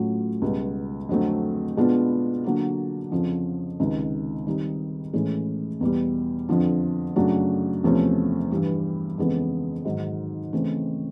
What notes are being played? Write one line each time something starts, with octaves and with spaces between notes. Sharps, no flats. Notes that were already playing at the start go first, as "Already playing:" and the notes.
Already playing: A2 F#3 A3 C#4 F4
C#2 B2 G3 B3
F2 D3 F#3 A3 C4
B2 G#3 B3 D4 F4
D3 F#3 A#3
F2 C#3 F3
C#2 C3 D#3
D#3 G3 C4 D#4
A2 E3 G#3 C#4
E2 B2 G3
F2 D3 F3
F#2 C#3 F#3 A3 D4
E2 C3 F3 A3 C#4
G2 E3 G3
F2 C#3 E3 G#3 B3
G#2 D#3 F#3
C#3 E3 A3 C4